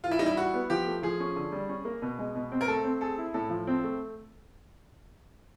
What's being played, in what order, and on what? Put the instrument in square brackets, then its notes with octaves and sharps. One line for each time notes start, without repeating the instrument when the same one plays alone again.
[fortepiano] E3 [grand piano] F4
[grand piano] E4
[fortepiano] G3 [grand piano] D#4
[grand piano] E4
[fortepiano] E4 [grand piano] F#4
[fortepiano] B3
[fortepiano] F3 [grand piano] G4
[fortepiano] A3
[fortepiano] F3 [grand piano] G#4
[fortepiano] C#4
D3
G3
C#4
A#3
B2
G#3
B2
C4
[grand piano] A#4
[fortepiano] A3 [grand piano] A4
[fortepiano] C4
[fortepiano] G#4 [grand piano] A4
[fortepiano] E4
[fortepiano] A2 [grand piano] A4
[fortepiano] F3
C4
A3